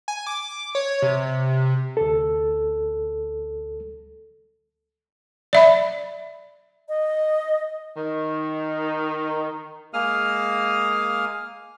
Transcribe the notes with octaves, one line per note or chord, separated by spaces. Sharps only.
G#5
D6
C#5
C3
D2 A4
D5 E5 B5
D#5
D#3
G#3 A#3 F5 D#6 F6